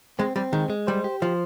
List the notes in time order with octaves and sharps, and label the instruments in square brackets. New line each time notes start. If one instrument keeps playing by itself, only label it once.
[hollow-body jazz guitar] G#3 [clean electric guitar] C4
[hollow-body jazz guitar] G3 [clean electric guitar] C4
[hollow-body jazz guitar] D#3 [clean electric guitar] G#3
[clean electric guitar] G#3
[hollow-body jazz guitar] G3 [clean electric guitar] C5
[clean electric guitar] G4
[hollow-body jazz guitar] F3 [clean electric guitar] C5